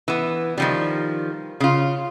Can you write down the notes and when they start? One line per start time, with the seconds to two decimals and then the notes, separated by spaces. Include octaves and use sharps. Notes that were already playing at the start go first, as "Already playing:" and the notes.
0.08 E3 B3
0.58 D#3 F3 G3
1.60 C#3 F4